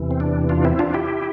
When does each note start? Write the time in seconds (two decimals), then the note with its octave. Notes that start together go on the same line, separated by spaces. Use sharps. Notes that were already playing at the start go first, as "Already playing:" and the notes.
Already playing: E2 C3 E3
0.11 C4
0.20 D4
0.49 D4 F4
0.65 C4 E4
0.79 D4 F4
0.94 E4 G4